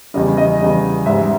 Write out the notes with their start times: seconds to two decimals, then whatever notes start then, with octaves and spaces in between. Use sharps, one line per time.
0.14 E2 C#3 G3 D#5
0.37 D#5
0.60 E2 C#3 G3
1.06 G#2 G3 E5